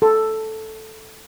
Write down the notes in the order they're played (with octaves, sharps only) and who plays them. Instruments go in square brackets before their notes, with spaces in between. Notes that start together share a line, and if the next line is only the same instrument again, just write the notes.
[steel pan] A4